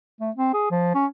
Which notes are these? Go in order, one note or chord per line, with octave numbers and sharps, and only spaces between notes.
A3
C4
G#4
F3
C#4